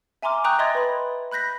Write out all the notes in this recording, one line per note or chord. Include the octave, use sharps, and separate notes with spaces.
E5 G#5 A#5 C6 D6 F6
G5 A#5 C#6 D#6 F#6 G6
D#5 E5 C6 D#6 G#6 A6
B4 B5
B5 F#6 G6 A#6 B6